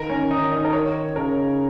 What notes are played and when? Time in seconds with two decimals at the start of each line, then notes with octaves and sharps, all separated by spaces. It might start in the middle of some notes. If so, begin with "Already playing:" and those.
Already playing: D#3 A#4
0.10 C#4
0.31 D#4
0.52 D#5
0.65 A#4
0.73 C#5
1.16 C#3 A#4